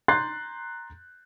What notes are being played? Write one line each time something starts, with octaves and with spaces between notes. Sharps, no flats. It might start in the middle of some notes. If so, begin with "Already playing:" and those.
A#5 C6 F#6 G6 A6 C7